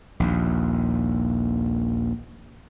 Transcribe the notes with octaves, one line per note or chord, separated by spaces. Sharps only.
A#1 D#2